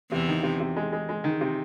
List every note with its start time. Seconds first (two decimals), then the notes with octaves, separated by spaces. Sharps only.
0.11 E2 C3 E3
0.28 D#3
0.43 C3
0.60 C3
0.76 G#3
0.93 G#3
1.09 G#3
1.24 D#3
1.41 C3